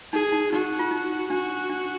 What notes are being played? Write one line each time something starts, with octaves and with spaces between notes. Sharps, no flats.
D#4 G#4
D#4
D#4 F#4
F4
D#4
D4 F#4
D4